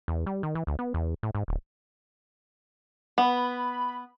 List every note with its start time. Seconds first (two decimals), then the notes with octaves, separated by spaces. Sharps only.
0.08 E2
0.26 G3
0.43 D#3
0.55 E3
0.67 D2
0.79 B3
0.94 E2
1.23 A2
1.35 G#2
1.48 D1
3.18 B3 B5